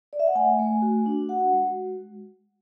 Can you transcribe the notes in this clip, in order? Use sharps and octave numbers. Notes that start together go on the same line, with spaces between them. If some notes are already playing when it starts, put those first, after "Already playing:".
D5
E5
F#5
A3 G#5
A3
F#4
D4
F#4 F#5
G#3